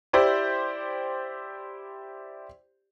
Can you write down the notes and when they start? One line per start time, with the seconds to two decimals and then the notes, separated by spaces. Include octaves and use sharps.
0.13 E4 G4 C5 D5